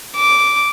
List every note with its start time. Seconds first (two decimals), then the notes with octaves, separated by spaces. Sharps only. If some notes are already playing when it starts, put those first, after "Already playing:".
0.16 D6